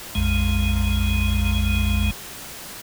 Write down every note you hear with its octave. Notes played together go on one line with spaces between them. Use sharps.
A#1 F2 G#3